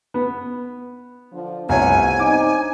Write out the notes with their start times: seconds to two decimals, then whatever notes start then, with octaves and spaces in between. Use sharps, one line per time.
0.14 B3
1.33 D3 F3
1.69 C2 F3 A3 B3 C#5 G#5
2.19 C4 D4 D#4 D6